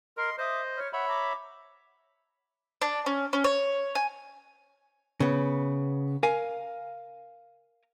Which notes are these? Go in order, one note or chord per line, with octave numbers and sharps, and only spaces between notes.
A#4 D#5 B5 C6
C5 D#5 E5 D6 D#6
C#5 B5 F6
C#5 E5 F#5 B5
A#5 D6
D4
C#4
C#4
C#5
G#5
C#3 B3
A#4 F5 G#5